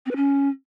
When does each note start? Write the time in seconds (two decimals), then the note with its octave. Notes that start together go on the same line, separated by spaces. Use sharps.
0.06 C4
0.11 B4
0.16 C#4